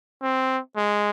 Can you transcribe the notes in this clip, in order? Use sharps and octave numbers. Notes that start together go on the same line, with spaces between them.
C4
G#3